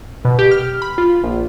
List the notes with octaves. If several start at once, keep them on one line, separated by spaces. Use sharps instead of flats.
B2
G4
F6
B5
F4
A#1